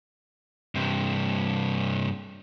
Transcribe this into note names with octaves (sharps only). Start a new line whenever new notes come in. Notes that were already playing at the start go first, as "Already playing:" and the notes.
G2 C3